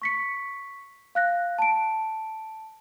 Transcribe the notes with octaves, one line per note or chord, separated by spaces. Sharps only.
C#6 B6 C#7
F5 F#6 A#6
A5 D7